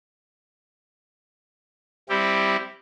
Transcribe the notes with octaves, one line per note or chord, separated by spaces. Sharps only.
G3 C4 E4 G4